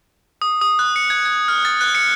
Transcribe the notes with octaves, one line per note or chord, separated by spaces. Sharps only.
D#6
D#6
F#6
C#7
G#6
G#6
F6
A6
F#6
C#7